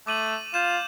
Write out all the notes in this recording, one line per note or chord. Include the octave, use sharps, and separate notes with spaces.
A3 D6 D#7 F#7
F4 G6 E7